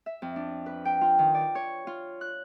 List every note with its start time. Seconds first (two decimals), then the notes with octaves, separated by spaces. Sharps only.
0.06 E5
0.22 F2
0.36 D4
0.66 B4
0.85 G5
1.01 F4
1.19 D#3
1.34 D5
1.55 C#5
1.87 F4
2.21 F#6